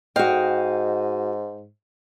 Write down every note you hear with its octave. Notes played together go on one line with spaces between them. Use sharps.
G#2 F#4 D#5 F5 G5